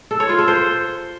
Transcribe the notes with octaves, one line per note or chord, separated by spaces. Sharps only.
A4
C#5
F4
A4
C5